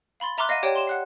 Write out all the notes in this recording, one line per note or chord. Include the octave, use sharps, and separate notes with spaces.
F5 B5 C6 A6
E5 A#5 C6 D6 F6 F#6
D#5 F5 F#5 D#7
G4 C#5 D5 G5
C6 E7
F#5 F#6 C7